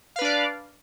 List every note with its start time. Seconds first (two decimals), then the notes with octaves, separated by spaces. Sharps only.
0.16 F5
0.19 B4
0.22 D4
0.24 D5